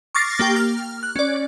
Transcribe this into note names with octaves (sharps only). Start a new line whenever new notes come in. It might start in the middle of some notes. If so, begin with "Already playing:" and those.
C#6 D6 F6 A6 A#6 C7
A#3 G4 G5
F6
F#6
C#4 D5